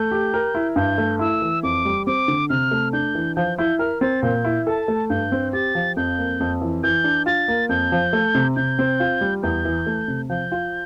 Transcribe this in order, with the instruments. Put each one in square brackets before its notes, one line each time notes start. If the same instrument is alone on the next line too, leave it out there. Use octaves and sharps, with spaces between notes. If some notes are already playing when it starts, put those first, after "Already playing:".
Already playing: [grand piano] A3 [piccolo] G6
[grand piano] G4
A#4
E4
[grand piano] G2 [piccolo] G6
[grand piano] A3
[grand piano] E4 [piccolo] E6
[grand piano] E3
[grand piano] F2 [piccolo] D6
[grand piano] G3
[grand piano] C4 [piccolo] D6
[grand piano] D3
[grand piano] C3 [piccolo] F6
[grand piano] A3
[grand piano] D4 [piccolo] G6
[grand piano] E3
[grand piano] F3 [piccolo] G6
[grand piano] E4 [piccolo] G6
[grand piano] A#4 [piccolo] F6
[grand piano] C4 [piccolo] A6
[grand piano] A#2 [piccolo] G6
[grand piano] E4
[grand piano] A4 [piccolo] A5
[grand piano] A3
[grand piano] G2 [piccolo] G6
[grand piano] C4
[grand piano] G4 [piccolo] A6
[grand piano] F3
[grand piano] F2 [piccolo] G6
[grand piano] A#3
F2
E3
[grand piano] E3 [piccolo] G6
[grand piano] D4
[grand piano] F4 [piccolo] A6
[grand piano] A#3
[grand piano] F2 [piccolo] G6
[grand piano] F3
A3
C3
[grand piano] C3 [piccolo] G6
[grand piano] C4
F4
G3
[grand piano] E2 [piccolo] G6
[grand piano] E3
A3
C3
[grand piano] F3 [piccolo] G6
[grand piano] F4